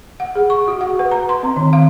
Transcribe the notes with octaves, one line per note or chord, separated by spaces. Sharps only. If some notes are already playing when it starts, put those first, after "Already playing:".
F#5
G#4
C#6
F#4
F#5
B4
A#5
C6
C4
D#3
F5